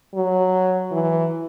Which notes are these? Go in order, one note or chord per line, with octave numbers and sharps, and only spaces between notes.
F#3
E3